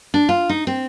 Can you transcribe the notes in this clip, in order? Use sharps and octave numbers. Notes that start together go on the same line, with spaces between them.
D4
F4
D#4
C4